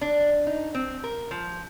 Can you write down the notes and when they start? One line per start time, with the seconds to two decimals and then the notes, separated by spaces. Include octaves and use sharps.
0.01 D4
0.47 D#4
0.75 C4
1.04 A#4
1.31 F3